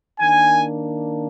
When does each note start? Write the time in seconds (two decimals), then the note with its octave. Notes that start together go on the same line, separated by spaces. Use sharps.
0.20 D#3 A#3 D4 G#5